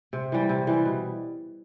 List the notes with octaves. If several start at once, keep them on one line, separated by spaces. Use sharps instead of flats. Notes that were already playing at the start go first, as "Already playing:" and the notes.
C3
E3 G3
C3
E3 G3
B2